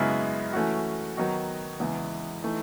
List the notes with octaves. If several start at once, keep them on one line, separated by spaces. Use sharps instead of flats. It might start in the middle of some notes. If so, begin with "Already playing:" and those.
Already playing: F#2 C#3 G#3 B3 E4
E3 A3 C#4 F#4
D#3 F#3 B3 D#4 F#4
E2 C#3 G#3 B3 E4
E3 A3 D#4